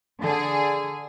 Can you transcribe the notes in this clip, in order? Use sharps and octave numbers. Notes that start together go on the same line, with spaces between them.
D3 G#4